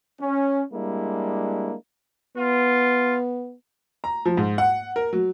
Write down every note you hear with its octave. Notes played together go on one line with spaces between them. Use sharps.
C#4
G3 G#3 A#3 D4 E4
B3 F4
A#5
F3
G#2
F#5
A#4
F#3